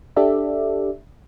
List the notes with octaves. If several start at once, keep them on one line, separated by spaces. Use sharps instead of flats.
D4 G4 A4 D5 E5